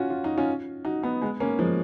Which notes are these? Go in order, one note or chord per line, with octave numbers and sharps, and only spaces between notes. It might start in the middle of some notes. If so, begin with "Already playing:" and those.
Already playing: C#4 F4 F#4
F4
D#4
C#4 F4
D#4 F#4
B3 D#4
G#3 B3
A#3 C#4
F3 G#3